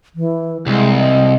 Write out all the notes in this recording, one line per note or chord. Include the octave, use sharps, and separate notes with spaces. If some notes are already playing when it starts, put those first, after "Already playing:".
E3
C2 G#3
D#5